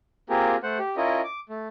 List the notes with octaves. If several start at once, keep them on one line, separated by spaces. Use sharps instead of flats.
A#3 C4 F4 G4 G#4 A#4
A3 C5 F#5
G4
C#4 E4 F4 A#4 D#5
D6
A3